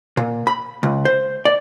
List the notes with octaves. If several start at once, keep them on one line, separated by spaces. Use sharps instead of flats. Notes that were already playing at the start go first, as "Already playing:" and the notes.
A#2
B5
C#2
C5
D5